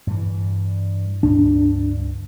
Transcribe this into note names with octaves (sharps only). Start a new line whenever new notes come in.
G2 E3
C#2 G2 D4